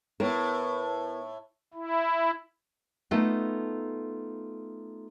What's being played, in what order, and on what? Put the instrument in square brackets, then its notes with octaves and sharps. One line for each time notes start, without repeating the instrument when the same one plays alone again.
[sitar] A2 [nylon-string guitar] B3 E4 A#4
[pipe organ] E4
[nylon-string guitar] A3 B3 D#4 F4 A4